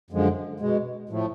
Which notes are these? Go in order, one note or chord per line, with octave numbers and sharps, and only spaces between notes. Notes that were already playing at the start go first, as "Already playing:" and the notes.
F#2 D3 F3 G#3
B2 G#3
A2 F3 A3